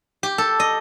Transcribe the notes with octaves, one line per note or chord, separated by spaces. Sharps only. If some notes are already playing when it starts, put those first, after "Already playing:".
G4
A4
D#5